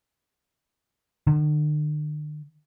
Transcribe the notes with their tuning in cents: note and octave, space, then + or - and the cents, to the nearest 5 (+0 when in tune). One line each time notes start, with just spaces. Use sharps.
D3 +45